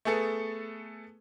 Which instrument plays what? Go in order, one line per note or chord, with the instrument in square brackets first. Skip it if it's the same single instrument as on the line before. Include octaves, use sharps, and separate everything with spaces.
[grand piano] A3 B3 G#4 A4